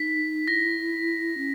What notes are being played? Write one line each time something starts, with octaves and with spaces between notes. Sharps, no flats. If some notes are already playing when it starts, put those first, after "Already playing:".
Already playing: D#4 B6
E4 A#6
C#4